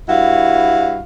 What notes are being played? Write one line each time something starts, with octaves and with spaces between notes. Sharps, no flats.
G2 E4 F#4 F5